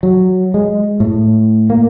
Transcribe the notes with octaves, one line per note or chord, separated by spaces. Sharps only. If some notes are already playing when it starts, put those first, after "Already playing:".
F#3
G#3
A2
A#3